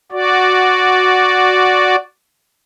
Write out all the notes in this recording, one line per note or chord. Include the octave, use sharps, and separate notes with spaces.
F#4 D5